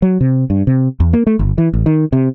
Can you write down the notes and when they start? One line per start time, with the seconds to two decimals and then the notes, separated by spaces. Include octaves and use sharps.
0.02 F#3
0.21 C3
0.50 G2
0.67 C3
1.00 E2
1.13 A#3
1.27 A3
1.39 G1
1.58 E3
1.74 A1
1.86 D#3
2.13 C3